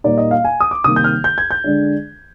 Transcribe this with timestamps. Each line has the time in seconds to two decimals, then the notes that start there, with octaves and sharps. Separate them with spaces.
0.04 A#2 G3 A#3 D#4 D5
0.18 D#5
0.31 F5
0.45 G#5
0.61 D#6
0.71 D6
0.84 C3 D#3 G3 A#3 D#6
0.96 G6
1.04 F6
1.24 G6
1.38 G#6
1.51 G6
1.64 D3 G#3 D4